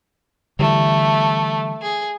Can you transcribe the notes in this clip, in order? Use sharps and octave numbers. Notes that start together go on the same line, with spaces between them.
D3 E3 G3 A3
G#4